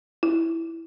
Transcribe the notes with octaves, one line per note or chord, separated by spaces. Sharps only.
E4